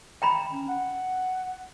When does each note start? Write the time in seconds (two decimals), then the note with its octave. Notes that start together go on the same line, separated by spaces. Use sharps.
0.22 G5 A#5 B5
0.51 C#4
0.68 F#5